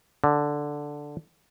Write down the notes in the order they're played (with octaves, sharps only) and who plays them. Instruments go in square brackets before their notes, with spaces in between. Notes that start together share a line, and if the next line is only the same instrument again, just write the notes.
[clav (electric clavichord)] D3